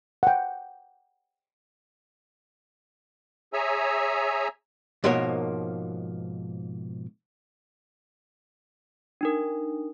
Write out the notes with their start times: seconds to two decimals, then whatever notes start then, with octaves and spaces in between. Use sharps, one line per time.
0.23 F#5 G5
3.53 G#4 C#5 E5 G#5 A#5 E6
5.04 G#2 B2 F3 A#3 A#4 C#5
9.21 D4 D#4 A#4